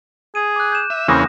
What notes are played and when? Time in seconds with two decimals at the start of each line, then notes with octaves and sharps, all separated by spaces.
0.35 G#4 D#7
0.56 D6 F#6
0.72 G6 E7
0.90 E5
1.08 E2 C#3 E3 A#3 C4 C#4 D#6 A#6